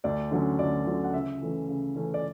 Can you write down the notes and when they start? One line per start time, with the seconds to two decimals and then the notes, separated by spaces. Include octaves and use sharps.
0.04 D2 D5
0.31 D3 F#3 C#4
0.59 D2 D5
0.87 D3 F#3 C#4
1.04 F#5
1.14 C#3 E5
1.41 E3 A3 C#4
1.69 C#3
1.96 E3 A3 C#4
2.14 D5